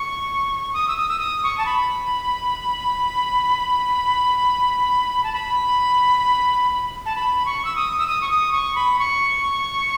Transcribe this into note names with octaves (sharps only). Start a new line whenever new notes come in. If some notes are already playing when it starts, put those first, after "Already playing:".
Already playing: C#6
D#6
E6
D#6
E6
D#6
C#6
A5
B5
A5
B5
A5
B5
C#6
E6
D#6
E6
D#6
C#6
D#6
C#6
B5
C#6